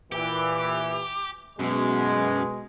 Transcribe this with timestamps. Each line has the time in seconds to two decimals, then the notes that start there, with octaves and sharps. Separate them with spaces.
0.12 A#2 E3 G4
1.59 F#2 B2 G#3